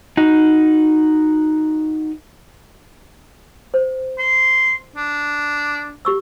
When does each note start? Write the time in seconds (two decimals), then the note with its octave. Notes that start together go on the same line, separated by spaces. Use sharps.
0.17 D#4 F#4
3.74 C5
4.18 C6
4.96 D4
6.05 G4 C#6 E6